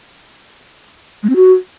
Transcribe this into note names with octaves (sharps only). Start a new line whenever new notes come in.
G#3
C4
F#4